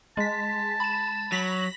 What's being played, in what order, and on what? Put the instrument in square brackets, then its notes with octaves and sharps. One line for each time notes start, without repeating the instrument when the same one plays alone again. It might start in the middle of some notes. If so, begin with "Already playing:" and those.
[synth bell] G#3 B6 [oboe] A5
[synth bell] B5 E7
[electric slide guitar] F#3 [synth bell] A#6 B6 F#7